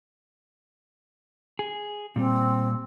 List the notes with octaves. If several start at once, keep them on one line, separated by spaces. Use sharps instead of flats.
G#4
A#2 G3 C4